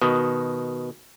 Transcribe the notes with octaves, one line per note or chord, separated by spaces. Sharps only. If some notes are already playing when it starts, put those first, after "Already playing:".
B2 D#3